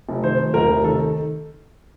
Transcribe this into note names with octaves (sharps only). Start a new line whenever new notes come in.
F1
D#3 C5
F1
D#2 A#4
F1
D#3 A4